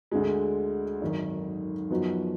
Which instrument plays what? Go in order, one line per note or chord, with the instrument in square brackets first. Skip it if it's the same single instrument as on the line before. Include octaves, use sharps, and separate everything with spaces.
[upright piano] D2 D3 G#3
G#1 F#2 D#3
F#2 F3 B3 D#4 F#4